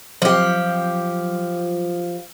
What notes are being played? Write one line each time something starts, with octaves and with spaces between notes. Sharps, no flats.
F3 F#3 G4